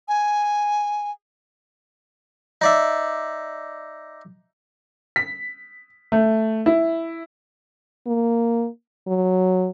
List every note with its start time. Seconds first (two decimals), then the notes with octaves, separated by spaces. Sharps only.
0.08 G#5
2.61 D#4 D5 E5
5.16 B6
6.12 A3
6.66 E4
8.07 A#3
9.07 F#3